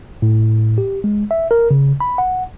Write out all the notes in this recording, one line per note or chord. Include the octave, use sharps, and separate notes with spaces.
A2
G4
G#3
E5
A#4
C#3
B5
F#5